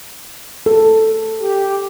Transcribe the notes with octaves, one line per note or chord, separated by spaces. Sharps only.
A4
G4